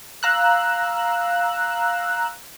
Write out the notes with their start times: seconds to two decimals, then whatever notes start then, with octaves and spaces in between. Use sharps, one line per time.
0.23 F5 A#5 E6 F#6